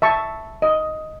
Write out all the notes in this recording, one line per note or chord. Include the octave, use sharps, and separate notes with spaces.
E5 A5 C#6
D#5